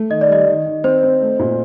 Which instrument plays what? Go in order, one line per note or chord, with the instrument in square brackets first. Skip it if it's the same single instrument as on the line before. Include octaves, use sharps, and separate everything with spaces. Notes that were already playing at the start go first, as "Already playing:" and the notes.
Already playing: [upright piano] A3
[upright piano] D#3 [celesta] D#5
[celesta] D5
[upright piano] G3 [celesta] D#5
[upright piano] D#3
D#3
[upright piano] C4 [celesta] C5
[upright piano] C4
A3
A#2